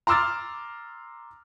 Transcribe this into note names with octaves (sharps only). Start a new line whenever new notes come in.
A#5 C6 D6 E6 F6 A6